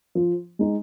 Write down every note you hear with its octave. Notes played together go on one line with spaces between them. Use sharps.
F3
G#3 D#4